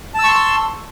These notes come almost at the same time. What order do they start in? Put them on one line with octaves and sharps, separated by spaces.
A5 E6 C#6 C6